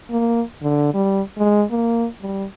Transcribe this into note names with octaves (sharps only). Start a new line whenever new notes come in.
A#3
D3
G3
G#3
A#3
G3